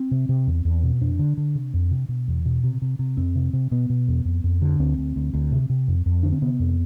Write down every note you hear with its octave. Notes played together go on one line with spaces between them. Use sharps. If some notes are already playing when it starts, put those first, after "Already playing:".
Already playing: C4
C3
C3
E2
E2
B2
F2 D4
D3
D3
C3
F2
C3
B2
E2
B2
C3
C3
C3
F2 C4
C3
C3
B2 B3
B2
E2
F2
F2
D3
D2 C4
D2
D2
D2
C3
C3
F2
F2
D3 D4
C4
C3 B3
F2